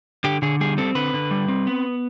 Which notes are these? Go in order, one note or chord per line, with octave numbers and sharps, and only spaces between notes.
D3 G4
D3 G#4
G3 G#4
C4 A4
D3 B4
D3
G3
C4
B3